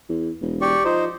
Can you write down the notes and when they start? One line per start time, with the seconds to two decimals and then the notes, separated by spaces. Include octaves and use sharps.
0.09 E2
0.41 E1
0.61 G4 D5 C#6
0.84 F3 D#4 C5